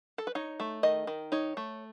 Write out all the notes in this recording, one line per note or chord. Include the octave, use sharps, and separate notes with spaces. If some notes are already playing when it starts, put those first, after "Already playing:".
A4
B4
D#4 C#5
A3
D#3 D#5
D#3
D#4 C#5
A3